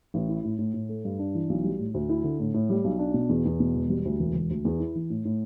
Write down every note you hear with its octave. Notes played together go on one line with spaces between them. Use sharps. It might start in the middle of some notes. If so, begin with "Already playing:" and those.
A1
E4
A2
A2
A2
A3
G2
D4
E3
B1
G3
A2
D2
E4
D3
A2
A2
G3
B1
D4
B2
E2
E2
B2
E1
G3
D2
E1
E1
D2
E2
E4
E3
A2
A2